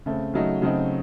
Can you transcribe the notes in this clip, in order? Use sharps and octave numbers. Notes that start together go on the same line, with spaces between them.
C#3 A3 C4
C#3 F#3 A3 D#4
C#3 F#3 A3 C4 D#4